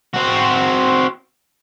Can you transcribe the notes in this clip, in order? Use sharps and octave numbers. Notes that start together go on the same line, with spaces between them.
C4 F#4